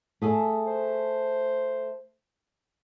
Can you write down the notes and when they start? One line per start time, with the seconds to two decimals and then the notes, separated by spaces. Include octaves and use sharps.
0.22 A3 G#4 A4
0.66 C5